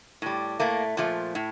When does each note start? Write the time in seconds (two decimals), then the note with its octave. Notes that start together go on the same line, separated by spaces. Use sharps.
0.22 A2 G3
0.59 A2 A3 A#3
0.97 A#2 F3 A3
1.35 A2